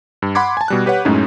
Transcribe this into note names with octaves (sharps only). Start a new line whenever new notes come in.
G2
F#5 B5 C6 D6 G#6
G#5 A5
B2 G3 F#6
G4 B4 C#5 F#5
F#2 A2 G#3 A3 C#4 D#4